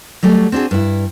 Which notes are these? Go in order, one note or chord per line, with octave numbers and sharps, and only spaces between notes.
F#3 G3 A3
C4 D4 F#4 G#4
G2 E4